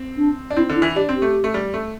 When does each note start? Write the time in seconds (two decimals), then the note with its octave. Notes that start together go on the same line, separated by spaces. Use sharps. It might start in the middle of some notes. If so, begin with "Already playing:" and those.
Already playing: C4
0.17 D4
0.51 D4
0.56 C4 E4
0.70 D3
0.76 E4
0.82 E3
0.96 D4 G4
1.09 C4
1.15 G4
1.22 A3
1.44 A3
1.54 G3
1.74 A3